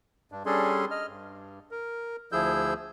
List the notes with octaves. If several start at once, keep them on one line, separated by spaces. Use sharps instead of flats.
G2 D4
G3 C#4 D4 G#4 A4 C6
D#5 F6
G2
A#4
D2 F3 E4 G#4 E6 G6